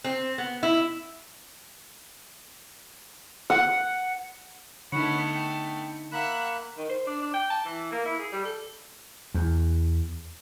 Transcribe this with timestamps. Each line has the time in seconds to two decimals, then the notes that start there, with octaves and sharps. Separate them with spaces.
0.04 C4
0.38 B3
0.63 E4
3.50 F#5
4.92 D3 A3 B3 D#4 C#5 F#5 B5 C#7
5.35 G5
6.12 A#3 E5 F#5 B5 F#6
6.78 D#3
6.90 C5
7.07 D4
7.22 D4
7.34 G5
7.50 A5
7.65 E3
7.92 A#3
8.05 E4
8.19 G#4
8.32 G3
8.45 A4
9.34 E2